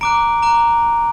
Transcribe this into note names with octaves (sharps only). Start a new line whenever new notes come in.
A#5 D6 F#6 D7
A#5 D6 F#6